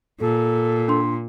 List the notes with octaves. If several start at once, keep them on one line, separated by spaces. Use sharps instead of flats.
A#2 A4
D4 C6